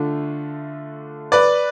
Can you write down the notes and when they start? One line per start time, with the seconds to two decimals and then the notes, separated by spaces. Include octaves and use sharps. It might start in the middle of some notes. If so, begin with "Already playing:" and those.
Already playing: D3 A3 D4 F4
1.32 B4 D5